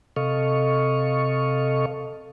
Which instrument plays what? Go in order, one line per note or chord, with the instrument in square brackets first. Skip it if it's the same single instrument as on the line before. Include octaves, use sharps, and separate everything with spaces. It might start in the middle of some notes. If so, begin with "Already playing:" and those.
[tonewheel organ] C3 A4 D#5 F5 C#6